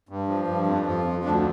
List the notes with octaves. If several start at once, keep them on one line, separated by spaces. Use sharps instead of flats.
G2
F3
G2
F2
F3
F2
D2 D4